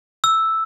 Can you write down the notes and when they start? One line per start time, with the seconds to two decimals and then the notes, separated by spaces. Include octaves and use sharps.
0.24 E6